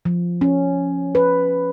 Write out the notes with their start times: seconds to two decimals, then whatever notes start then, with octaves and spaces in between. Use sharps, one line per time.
0.05 F3
0.41 C#4
1.15 B4